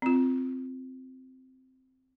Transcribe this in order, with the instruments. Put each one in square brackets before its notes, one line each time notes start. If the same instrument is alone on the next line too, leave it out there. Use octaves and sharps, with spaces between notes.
[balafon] C4 F4